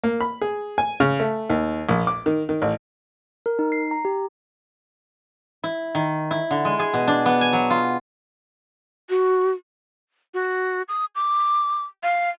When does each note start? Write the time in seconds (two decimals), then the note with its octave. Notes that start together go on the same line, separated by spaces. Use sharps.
0.04 A#3
0.21 B5
0.41 G#4
0.78 G#5
1.00 C#3
1.20 A3
1.50 D#2
1.89 A#1
2.07 D6
2.26 D#3
2.49 D#3
2.62 A1
3.46 A#4
3.59 D#4
3.72 C7
3.91 A#5
4.05 G4
5.64 E4
5.95 D#3
6.31 E4
6.51 D3
6.65 G#3
6.79 G#4
6.94 B2
7.07 D4
7.26 B3
7.41 G#5
7.53 F#3
7.70 F4
9.10 F#4
10.34 F#4
10.89 D#6
11.15 D6
12.03 F5